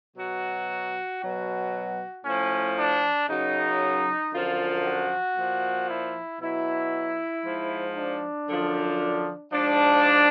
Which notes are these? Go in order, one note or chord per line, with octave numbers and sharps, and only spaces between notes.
B2 F#3 F#4
B2 F#3 F#4
A2 F3 C#4
D4
F#2 C#3 F#3 D#4
F#2 D3 F3 F4
F#4
A#2 F3
E4
B2 F#3 E4
G#2 F3
D4
F#2 D3 F3
G#2 F3 D4